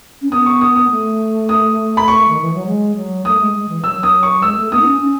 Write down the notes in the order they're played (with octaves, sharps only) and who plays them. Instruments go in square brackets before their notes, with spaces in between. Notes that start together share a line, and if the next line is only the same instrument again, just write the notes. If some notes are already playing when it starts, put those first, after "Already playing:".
[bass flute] C#4
[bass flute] B3 [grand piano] D#6
[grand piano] C#6
D#6
D#6
[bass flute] A3
[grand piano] D#6
B5
C#6
[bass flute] D#3
E3
F#3
G#3
F#3
[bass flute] A3 [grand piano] D#6
[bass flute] G#3
G#3
E3
[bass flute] F#3 [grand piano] E6
[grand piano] D#6
C#6
[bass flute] G#3 [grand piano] E6
[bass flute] A3
[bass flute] B3 [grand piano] D#6
[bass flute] D#4
C#4
C#4